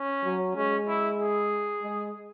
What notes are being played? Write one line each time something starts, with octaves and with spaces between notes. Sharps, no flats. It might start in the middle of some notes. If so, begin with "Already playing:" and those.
Already playing: C#4
F#3
G#3 C#4
E4
G#4
G#3